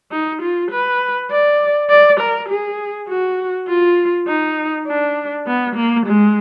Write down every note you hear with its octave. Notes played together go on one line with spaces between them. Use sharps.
D#4
F4
B4
D5
D5
A#4
G#4
F#4
F4
D#4
D4
B3
A#3
G#3